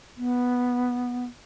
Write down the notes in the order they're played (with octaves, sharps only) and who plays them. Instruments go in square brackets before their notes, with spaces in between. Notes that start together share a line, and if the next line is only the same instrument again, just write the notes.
[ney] B3